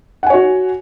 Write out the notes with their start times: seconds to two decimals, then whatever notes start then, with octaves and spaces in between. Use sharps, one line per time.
0.23 F#5
0.27 G#5
0.30 C#5
0.34 F#4